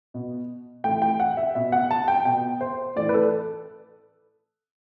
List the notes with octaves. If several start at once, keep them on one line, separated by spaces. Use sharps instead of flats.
B2
A2 E3 G5
G5
F#5
E5
B2 E5
F#5
A5
G5
B2 G5
C5
A2 E3 D5
B4
A4